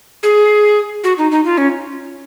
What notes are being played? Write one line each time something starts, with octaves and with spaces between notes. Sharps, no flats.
G#4
F#4
D#4
D#4
F4
C#4